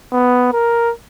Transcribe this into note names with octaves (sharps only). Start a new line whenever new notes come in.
B3
A#4